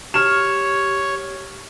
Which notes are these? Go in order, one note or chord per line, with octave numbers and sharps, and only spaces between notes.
G4 C#5 F6 E7